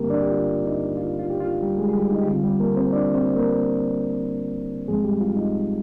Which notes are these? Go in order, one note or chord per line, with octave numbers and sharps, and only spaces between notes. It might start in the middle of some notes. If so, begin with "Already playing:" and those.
Already playing: G2 D3 G3 A#3 C4 G4 A#4
D4 D5
G4
F4
D#4
F4
F4
G4
F4
G3 G4
G#3 G#4
G#4
G3 G4
D#4
G4
D3 G3 C4 F4
G3 G4
A#3 A#4
C4 C5
D4 D5
C4 C5
A#3 A#4
G#2 F3 G#3 C4 G#4
G3 G4
F4
D#4